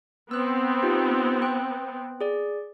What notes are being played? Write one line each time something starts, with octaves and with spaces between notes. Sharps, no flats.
B3 C4 E6 F#6
D#4 F4 G4
G5 F#6
G#4 D5